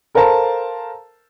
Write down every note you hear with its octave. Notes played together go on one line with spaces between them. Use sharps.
A4 A#4 C5 F5 A5 A#5